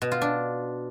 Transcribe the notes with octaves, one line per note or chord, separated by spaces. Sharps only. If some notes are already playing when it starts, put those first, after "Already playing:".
B2
F4
D4